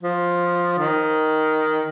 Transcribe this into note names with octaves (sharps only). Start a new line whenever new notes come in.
F3
D#3